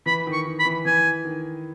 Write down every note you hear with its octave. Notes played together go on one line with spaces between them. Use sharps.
E3 B5
D#3
C#6
D#3
B5
E3
E3 G#5
D#3